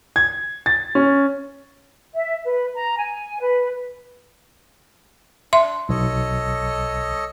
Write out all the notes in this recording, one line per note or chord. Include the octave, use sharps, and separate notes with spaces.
G#6
A6
C#4
E5
B4
A#5
G#5
B4
D4 E5 C6
B1 A4 C#5 D#5